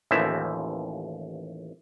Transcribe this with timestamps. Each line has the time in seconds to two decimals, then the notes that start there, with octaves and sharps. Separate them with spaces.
0.11 A1 D#2 E3 F3 E5